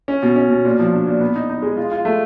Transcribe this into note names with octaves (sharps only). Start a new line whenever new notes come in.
C#4
B2
C#4
B2
A#2
F3
D4
A#2
B3
D#4
D#4
G#3
F4
F4
A3